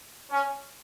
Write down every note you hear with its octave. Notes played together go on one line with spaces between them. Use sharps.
C#4